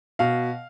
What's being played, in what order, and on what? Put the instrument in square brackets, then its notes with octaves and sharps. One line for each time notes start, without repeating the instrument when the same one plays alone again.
[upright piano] B2 F5